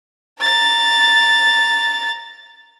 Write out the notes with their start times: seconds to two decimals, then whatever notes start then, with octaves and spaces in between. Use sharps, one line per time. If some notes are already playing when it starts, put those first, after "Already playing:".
0.40 A#5 A6